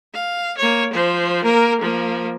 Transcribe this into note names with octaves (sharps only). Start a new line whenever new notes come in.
F5
A#3 C#5
F3 C5
A#3 A#4
F3 A#3